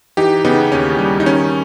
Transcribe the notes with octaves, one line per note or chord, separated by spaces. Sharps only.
E3 D#4 G4
C#3 B3 D#4
D#2 C#4
G3
D#4
D#3 C#4